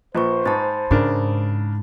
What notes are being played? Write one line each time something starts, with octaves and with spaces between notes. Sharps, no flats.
A#1 F4 B4 C5 C#6
G#2 A5 B5 A6
G#2 C#3 D4 A#4